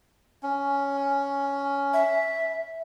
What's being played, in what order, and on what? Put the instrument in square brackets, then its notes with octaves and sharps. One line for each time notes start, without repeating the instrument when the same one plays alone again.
[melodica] C#4
[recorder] E5